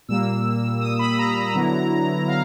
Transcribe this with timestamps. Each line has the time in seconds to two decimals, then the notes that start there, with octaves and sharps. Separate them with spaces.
0.08 A#2 G3 A#3 E6
0.81 D#6
0.99 B5
1.19 A#5
1.54 D3 F#3 B3 E4
2.28 F5